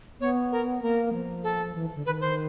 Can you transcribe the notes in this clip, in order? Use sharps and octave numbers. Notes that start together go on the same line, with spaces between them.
B3 C#5
A#4
A#3 A#4
F3
A4
E3
D3
D#3 B4
C5